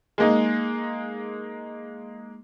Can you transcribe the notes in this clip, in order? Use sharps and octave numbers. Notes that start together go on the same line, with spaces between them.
G#3 A#3 D#4